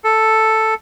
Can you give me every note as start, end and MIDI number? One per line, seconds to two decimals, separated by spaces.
0.04 0.74 69